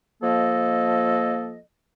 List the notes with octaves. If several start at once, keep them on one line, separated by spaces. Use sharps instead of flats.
F3 A#3 A4 D#5